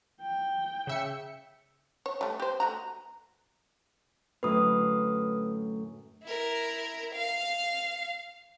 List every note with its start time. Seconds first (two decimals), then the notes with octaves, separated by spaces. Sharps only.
0.22 G5
0.87 C#3 E5 C#7
2.06 C#5
2.21 G3 A3
2.40 G4 C5
2.60 A3 F#4 A#5
4.43 F#2 A2 D3 B4 D#6
6.23 E4 A#4
7.15 F5